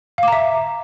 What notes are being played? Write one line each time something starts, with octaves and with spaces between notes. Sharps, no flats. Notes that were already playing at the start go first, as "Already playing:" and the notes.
E5 F5 A#5 D6